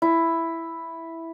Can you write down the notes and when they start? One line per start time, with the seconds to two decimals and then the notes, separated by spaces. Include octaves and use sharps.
0.02 E4